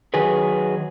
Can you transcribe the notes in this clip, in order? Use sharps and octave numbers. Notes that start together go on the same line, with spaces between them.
D#3 F#3 G#4 B4